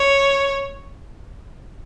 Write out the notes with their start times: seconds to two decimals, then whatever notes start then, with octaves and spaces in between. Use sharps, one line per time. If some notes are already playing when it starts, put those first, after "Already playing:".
Already playing: C#5